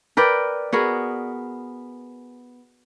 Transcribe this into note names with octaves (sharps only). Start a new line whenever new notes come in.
A#4 B4 D5 G5
B3 F#4 G#4 A#4